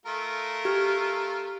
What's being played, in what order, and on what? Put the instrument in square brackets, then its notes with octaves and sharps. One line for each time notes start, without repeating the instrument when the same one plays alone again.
[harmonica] A3 F4 A#4
[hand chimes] G4 F6